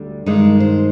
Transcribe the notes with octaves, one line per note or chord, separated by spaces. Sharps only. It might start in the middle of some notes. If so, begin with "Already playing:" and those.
Already playing: D2 D3 G3
G2 D#3 G#3 D#4
C5